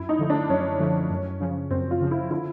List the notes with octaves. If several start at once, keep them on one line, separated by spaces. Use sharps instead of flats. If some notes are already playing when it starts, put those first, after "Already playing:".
Already playing: F#2 E4
D#4
D3 F3 A3
D4
F#2 C#4
D3 F3 A3
F#2
C#3 F3
F#2 C4
F4
C#3 F3
E4
D3 E4